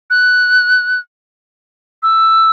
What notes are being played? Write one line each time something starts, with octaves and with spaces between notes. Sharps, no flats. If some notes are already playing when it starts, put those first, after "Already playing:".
F#6
E6